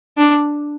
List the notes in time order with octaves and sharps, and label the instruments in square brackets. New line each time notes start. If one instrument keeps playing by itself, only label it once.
[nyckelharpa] D4